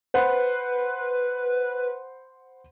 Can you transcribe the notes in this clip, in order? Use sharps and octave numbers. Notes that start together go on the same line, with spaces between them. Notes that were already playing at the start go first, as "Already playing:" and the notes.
B4 C5 F#5 B5